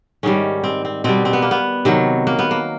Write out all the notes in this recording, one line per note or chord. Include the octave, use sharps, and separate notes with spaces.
G#2 D#3 G3 C#4
C4
C4
B2 G3 C4
C4
B3
A#3
B3
C3 D#3 F#3
A#3
B3
A#3